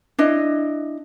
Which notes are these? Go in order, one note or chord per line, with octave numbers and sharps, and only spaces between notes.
D4 E4 D#5